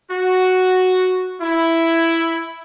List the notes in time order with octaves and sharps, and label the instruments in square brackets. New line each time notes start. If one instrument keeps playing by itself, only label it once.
[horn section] F#4
E4